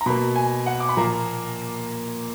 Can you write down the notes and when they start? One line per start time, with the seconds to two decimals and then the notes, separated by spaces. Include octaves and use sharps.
0.01 A#5
0.06 B2 A#3 B5
0.36 G#5
0.66 F#5
0.80 D6
0.89 B5
0.97 A#2 F3 A#3 A#5